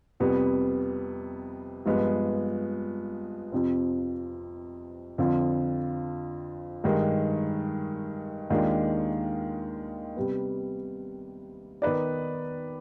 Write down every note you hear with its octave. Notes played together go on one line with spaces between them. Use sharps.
F2 C3 G3 B3
G2 F3 G#3 B3
F2 C3 F3 C4
F2 D3 F3 C4 F4
G2 D#3 G#3
D#2 D#3 G#3 D4 F4
C3 G3 B3
D#3 B3 D#4 B4 D5